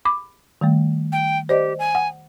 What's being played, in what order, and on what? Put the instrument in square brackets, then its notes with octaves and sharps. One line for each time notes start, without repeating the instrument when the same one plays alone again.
[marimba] B5 D6
D#3 G3 A3
[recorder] G5
[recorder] G4 [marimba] C5 D5 D#5
[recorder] G#5
[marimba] F#5